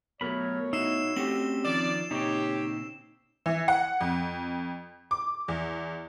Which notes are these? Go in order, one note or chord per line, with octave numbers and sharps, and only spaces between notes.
B2 F#3 A3 A#4 C#5 B5
D#4 E4 F#4 E6 C7 E7
A3 C4 C#4 F#4 G4 F#7
D#3 F3 D5 E7
A#2 C#3 C4 D#4 G4 C#5
E3
F#5
F2
D6
E2